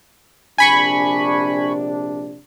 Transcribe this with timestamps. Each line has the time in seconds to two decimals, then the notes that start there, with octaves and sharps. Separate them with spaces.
0.58 A#1 C3 D4 G#5 B5 C#6